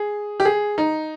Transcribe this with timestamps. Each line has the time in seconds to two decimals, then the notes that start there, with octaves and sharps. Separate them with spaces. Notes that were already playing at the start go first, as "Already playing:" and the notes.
Already playing: G#4
0.40 G4
0.45 G#4
0.78 D#4